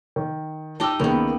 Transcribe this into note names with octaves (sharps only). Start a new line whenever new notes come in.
D#3
D#4 G4 D#5 A5 D6 E6
C#2 D#3 A#3 B3